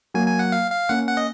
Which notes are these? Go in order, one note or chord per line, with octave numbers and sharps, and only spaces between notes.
F#3 A#3 G#5
G#5
F#5
F5
F5
A#3 C#4 F#5
F#5
D#5